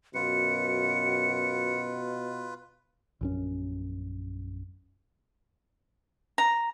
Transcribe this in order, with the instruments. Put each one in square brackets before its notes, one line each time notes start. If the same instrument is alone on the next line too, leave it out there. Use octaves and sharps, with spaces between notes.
[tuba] F#2 [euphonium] B2 [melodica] F4 B4 [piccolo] C#7
[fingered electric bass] A#1 F#2 C#4
[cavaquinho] A#5